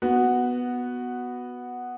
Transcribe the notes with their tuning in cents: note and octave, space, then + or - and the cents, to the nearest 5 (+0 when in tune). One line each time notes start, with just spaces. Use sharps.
B3 +0 F#4 +0